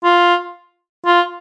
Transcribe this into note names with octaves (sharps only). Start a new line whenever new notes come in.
F4
F4